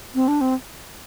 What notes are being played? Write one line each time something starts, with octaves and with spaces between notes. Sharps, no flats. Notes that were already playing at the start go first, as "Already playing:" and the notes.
C4
D4
C4